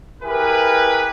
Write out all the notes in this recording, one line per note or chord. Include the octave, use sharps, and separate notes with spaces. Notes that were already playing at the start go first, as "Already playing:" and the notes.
E4 G4 G#4 A#4 B4